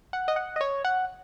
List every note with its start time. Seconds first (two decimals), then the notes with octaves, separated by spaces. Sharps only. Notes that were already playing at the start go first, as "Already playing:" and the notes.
0.13 F#5
0.28 D#5
0.36 F#5
0.56 D#5
0.61 C#5
0.84 F#5